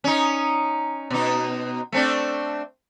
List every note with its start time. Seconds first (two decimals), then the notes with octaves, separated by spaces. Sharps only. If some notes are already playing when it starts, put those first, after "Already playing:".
0.04 C#4 D#4
1.10 B2 D#4
1.92 A3 C4 D4